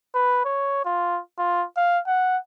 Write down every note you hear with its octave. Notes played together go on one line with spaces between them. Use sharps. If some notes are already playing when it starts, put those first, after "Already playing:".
B4
C#5
F4
F4
F5
F#5